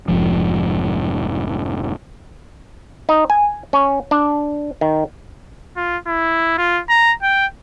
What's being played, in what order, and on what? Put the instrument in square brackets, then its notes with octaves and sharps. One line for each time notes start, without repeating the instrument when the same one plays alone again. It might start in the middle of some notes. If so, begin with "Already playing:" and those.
[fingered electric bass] F1 G#2 F3
[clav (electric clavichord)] D#4
G#5
C#4
D4
D#3
[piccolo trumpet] F4
E4
F4
A#5
G5